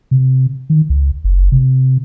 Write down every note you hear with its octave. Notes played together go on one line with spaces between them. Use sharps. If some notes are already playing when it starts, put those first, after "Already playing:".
C3
D#3
C#2
F#1
C3